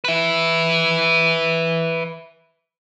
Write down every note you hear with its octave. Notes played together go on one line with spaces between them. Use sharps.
B4 E5